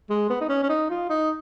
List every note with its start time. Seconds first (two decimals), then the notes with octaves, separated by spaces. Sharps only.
0.10 G#3
0.29 B3
0.41 D#4
0.49 C#4
0.63 C#4
0.69 D#4
0.90 F4
1.09 D#4